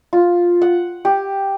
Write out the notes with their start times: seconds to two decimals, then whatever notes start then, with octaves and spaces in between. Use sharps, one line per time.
0.13 F4
0.62 F#5
1.05 G4